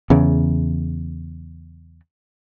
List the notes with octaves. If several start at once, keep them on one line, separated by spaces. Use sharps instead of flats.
E2 C#3